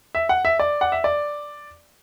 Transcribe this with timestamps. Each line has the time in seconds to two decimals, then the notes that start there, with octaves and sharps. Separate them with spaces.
0.15 E5
0.29 F#5
0.45 E5
0.59 D5
0.81 F#5
0.92 E5
1.04 D5